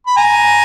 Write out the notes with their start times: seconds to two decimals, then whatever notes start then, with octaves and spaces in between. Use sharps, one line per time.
0.07 B5
0.17 G#5 A#5